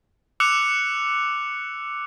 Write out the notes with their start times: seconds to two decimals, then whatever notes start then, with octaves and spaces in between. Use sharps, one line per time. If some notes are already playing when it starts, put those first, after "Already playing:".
0.40 D6 E6 F#6 C#7 F7